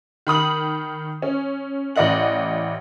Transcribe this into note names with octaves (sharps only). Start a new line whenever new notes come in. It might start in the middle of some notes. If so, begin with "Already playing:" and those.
D#3 B5 D#6 F#7
C#4
A1 D5 D#5 F#5 F#7